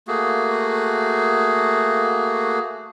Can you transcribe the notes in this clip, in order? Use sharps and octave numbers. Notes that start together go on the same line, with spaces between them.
A3 A#3 F#4 G#4